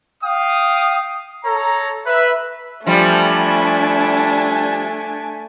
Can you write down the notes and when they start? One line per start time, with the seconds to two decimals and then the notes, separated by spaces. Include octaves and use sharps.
0.23 F5 G5 D#6
1.45 A4 C#5 A#5
2.07 B4 E5
2.87 F3 G3 A3 D4 G#5